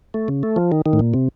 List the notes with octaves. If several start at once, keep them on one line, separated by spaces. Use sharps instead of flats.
A3
C#3
A3
F3
D#3
D#3
A2
A#2
C3